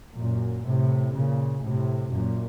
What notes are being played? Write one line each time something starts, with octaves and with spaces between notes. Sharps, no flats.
F#2 A#2
A2 C3
A#2 C#3
A2 C3
F#2 A#2